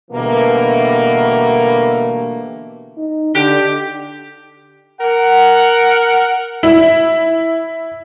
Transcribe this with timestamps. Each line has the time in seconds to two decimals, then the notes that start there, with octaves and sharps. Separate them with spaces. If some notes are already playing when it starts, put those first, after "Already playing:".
0.11 B2 D3 E3 G3 A3 A#3
2.97 D#4
3.35 D3 G4
5.01 A#4 F#5
6.63 E4